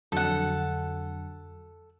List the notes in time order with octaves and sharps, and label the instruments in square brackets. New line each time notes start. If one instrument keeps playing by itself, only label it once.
[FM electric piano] F2 D3 F#3 [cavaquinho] A4 F#5